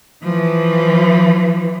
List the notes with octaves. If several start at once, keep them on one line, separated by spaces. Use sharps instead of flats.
E3 F3